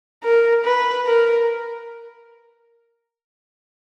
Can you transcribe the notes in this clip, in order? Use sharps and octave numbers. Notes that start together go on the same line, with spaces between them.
A#4
B4
A#4